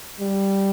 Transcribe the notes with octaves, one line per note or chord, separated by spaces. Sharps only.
G3